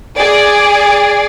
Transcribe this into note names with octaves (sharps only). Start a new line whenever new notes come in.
G#4 D5